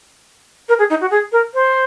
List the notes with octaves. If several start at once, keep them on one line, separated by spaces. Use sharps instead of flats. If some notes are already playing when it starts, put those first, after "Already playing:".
A#4
G#4
D#4
F#4
G#4
A#4
C5